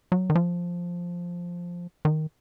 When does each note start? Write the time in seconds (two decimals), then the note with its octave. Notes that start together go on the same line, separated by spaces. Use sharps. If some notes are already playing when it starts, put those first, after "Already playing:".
0.12 F#3
0.30 D#3
0.35 F3
2.05 D#3